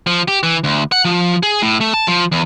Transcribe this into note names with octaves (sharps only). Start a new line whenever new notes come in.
F3
G4
E3
D2
F#5
F3
G#4
A2
A3
A5
F3
E2